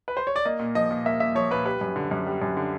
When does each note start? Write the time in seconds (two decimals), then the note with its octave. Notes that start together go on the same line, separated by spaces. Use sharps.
0.08 B4
0.17 C5
0.27 C#5
0.36 D5
0.45 A#3 D#5
0.59 A#2
0.75 F3 D#5
0.91 A#2
1.06 A#3 E5
1.20 A#2 E5
1.35 F3 C#5
1.51 A#2 B4
1.65 G3 B4
1.81 F#2
1.96 D3
2.11 F#2
2.26 G3
2.42 F#2
2.57 D3